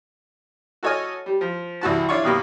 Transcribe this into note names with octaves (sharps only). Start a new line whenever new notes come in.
F#4 A4 C#5 D#5 G#5 F6
G3
F3
C2 E3 F#4 A5
D4 E4 F4 C#5 D5 C#6
G2 B2 D#3 A#3 B3